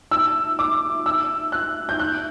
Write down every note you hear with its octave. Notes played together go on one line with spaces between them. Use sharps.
E6
D6
E6
F#6
G6
F#6